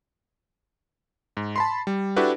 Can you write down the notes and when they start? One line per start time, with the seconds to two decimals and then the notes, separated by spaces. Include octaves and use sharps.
1.37 G#2
1.56 A5 B5 C6
1.87 G3
2.16 D4 E4 F#4 G4 A4 B4